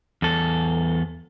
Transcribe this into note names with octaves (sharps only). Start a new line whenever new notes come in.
E2 A4